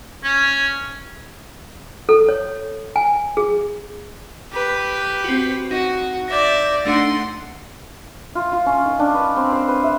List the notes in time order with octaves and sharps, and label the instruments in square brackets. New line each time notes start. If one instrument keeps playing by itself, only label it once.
[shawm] C#4
[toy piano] A4
C#5
G#5
G#4
[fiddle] G4 B4
[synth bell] C4 F#4
[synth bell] D#4 [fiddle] F#4
[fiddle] D5 E5 [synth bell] G6 A#6
[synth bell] A3 D4 D#4 [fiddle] F#5 C6
[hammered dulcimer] F4
F4
C#4
D#3
D4
B4
C4
C5
B4
E5